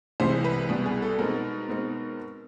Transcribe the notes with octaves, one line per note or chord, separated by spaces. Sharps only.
C2 C3 E3 G#3 C5
B4
C2 B2 G3
G#4
A4
B2 G#3 C4 D#4 A#4
B2 G#3 C4 D#4